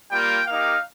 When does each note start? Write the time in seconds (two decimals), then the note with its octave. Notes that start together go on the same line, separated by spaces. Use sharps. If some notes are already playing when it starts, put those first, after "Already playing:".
0.11 G3 A#3 F4 G5
0.47 A#3 D#4 G4 F5